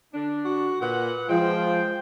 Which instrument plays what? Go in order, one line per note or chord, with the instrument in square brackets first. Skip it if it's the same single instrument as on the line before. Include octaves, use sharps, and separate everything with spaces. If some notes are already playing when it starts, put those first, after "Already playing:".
[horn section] D3 D4
[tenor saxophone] F#4
[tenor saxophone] A#2 [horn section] B4 F#5
[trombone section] F3 F4 [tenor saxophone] G#3 [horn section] C5 G5